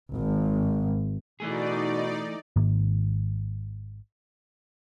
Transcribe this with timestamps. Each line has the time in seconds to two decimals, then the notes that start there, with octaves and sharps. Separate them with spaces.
0.13 G#1
1.40 B2 E3 A3 D#4 G#4 D5
2.56 G#1 G#2 D#3 A#3